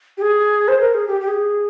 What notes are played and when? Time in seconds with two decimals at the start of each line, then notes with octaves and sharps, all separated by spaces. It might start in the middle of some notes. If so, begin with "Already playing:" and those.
0.18 G4
0.22 G#4
0.68 C5
0.80 A#4
0.94 G#4
1.07 G4
1.21 G4
1.28 G#4